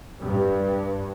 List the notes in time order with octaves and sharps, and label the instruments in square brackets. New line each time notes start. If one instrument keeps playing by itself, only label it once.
[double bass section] G2